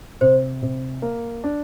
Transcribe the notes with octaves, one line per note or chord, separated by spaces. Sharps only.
C3 C5
C3
A#3
D4